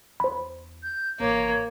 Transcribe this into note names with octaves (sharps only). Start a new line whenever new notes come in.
E2 E4 C5 B5
G6
A1 C3 A#3 C#5